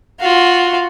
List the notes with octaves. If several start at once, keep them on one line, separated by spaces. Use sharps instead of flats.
F4 F#4